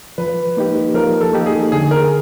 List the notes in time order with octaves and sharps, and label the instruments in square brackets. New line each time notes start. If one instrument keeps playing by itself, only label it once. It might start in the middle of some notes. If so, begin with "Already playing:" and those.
[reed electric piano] F3 [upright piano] B4
[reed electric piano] A#3 D#4 G4
[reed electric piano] F3 [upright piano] A#4
[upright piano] A4
[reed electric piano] A#3 D#4 G4
[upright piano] G#4
[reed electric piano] D3 [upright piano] G#4
[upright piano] A#4